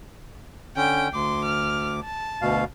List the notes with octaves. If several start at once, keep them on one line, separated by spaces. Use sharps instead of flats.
D3 C#4 G5
D2 C6 D6
F6
A5
D2 B2 F5